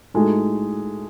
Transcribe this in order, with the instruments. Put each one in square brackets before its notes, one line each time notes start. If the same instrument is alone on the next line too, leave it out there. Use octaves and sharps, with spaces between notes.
[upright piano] A2 G#3 D#4 F#4 A4